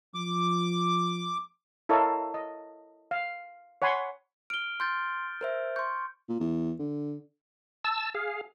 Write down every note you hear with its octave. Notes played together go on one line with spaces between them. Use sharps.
F3 D6
E4 A4 A#4 C#5 D#5 F5
D#5
F5
C#5 F#5 G#5 B5 C6
F6 D7 G7
C6 F6 G6 A6
A#4 C5 E5
C6 C#6 G6
A#2
E2
D3
A5 E6
G#4 F5